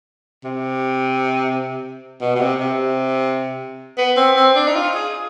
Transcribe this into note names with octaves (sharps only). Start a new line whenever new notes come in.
C3
B2
B2
C3
C3
B3
C4
C4
D4
D#4
F4
G#4